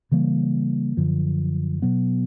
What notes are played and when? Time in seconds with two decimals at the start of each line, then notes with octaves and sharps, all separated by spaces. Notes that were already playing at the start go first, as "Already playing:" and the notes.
0.11 C#3 E3 G3 A#3
0.97 F#2 D3 F3
1.82 B2 F#3 B3